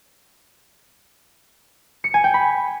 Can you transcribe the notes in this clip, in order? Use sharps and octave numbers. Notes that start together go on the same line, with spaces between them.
C#7
G#5
G5
B5